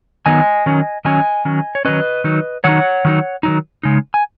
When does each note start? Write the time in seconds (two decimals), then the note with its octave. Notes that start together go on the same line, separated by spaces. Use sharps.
0.26 D#3 F#3 B3 D#4 D#5 G#5
0.66 D#3 F#3 C#4
1.05 D#3 F#3 C#4 D#5 G#5
1.45 D#3 F#3 C#4
1.75 C#5
1.85 D#3 F#3 C#4 B4 D#5
2.24 D#3 F#3 D#4
2.64 D#3 F#3 D#4 C#5 F#5
3.05 D#3 F#3 D#4
3.43 D#3 F#3 D#4
3.83 C#3 G#3 D#4
4.14 G#5